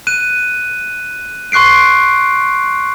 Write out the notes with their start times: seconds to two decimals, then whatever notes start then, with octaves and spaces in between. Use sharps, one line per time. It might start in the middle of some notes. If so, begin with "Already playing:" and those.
0.07 F#6 D#7
1.52 C6 C#6 F#6 C7 D7